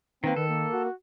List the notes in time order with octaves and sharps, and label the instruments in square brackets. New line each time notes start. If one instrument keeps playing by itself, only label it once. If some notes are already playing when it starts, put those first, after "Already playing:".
[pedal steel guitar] D#3 A#3 [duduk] C4 [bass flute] B4
[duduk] D#3 [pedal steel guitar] A4
[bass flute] A#3
[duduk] F#4